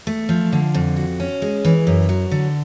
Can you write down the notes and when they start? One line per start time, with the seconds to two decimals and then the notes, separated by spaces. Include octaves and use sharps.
0.07 A3
0.29 F3
0.52 D3
0.74 F2
0.96 F#4
1.20 C#4
1.42 G#3
1.65 E3
1.87 F#2
2.09 F#3
2.31 D3